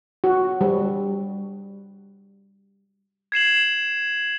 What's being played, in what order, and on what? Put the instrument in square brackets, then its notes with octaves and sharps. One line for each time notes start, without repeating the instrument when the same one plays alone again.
[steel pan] F#4
G3
[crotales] G#6 C7 E7 F#7